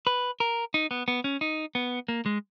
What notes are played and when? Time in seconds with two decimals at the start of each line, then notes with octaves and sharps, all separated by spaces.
0.07 B4
0.40 A#4
0.74 D#4
0.91 B3
1.08 B3
1.24 C#4
1.41 D#4
1.75 B3
2.08 A#3
2.26 G#3